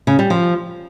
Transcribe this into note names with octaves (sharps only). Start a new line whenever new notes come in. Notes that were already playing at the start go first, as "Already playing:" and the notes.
C#3
G3
F3